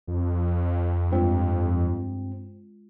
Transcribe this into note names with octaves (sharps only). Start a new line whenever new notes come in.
F2
G2 G#3 C4 F4